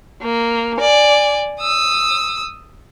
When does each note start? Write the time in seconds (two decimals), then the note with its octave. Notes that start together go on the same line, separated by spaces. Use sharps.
0.22 A#3
0.78 D5 G#5
1.61 D#6 E6